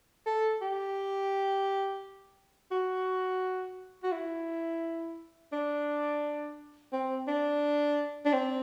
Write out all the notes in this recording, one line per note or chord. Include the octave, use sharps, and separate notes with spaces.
A4
G4
F#4
F#4
E4
D4
C4
D4
D4
C4